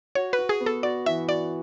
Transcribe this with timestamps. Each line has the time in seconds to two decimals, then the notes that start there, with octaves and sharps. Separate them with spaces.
0.15 F#4 C#5
0.33 B4
0.39 F#4
0.49 G#4
0.60 B3
0.66 A4
0.83 F#4 D5
1.06 E3 E5
1.28 F#4 D5